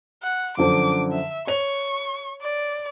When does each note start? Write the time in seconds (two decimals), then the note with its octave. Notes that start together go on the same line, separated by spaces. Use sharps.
0.23 F#5
0.57 F#2 D3 F3 D6
1.12 E5
1.47 C#5 C#6 F7
2.42 D5